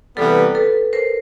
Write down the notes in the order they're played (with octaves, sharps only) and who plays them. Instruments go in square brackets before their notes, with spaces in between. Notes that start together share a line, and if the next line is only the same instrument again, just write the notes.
[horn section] C3 E3 G3 B3 [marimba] A4 B4
[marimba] A4 B4
A#4 C5